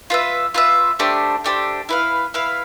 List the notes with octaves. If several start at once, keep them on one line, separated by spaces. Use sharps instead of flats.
F4 B4 E5
F4 B4 E5
A3 D4 G4 C5
A3 D4 G4 C5
E4 B4 F5
E4 B4 F5